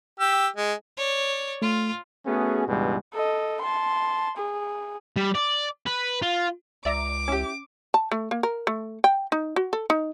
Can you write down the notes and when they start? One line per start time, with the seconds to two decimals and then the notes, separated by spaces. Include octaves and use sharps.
0.20 G4 E6
0.56 G#3
0.97 C#5 D5
1.62 A3 F4
2.26 A3 B3 C#4 F#4 G#4
2.68 C#2 G2 B2 E3 G3 G#3
3.13 A4 D#5
3.61 A5 C6
4.37 G#4
5.16 G3
5.35 D5
5.87 B4
6.22 F4
6.85 C#2 D5 E5 A#5 D6
7.28 C#4 E4 G4
7.94 A5
8.11 A3
8.31 A#3
8.43 A#4
8.67 A3
9.04 G5
9.32 D#4
9.56 F#4
9.73 A4
9.90 D#4